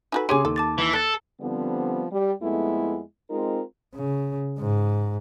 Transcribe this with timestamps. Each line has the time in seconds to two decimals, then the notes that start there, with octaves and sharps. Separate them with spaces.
0.12 D#4 F#4 A4 B4 G#5
0.29 C#3 G4 G#4 C#5 G#5 C6 D6 D#7
0.45 D#2 A4
0.56 A5 D6 A6
0.78 E3
0.93 A4 F#6 A6
1.41 D3 F3 G3 B3 C4
2.12 G3
2.42 F2 G#3 A3 B3 E4
3.31 G#3 C4 D#4 F4 A#4
3.95 C#3
4.58 G#2